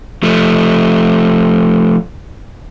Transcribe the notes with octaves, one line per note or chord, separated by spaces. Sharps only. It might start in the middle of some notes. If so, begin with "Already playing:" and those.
F3 A3